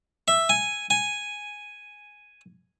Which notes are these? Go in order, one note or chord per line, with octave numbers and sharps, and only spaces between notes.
E5
G#5
G#5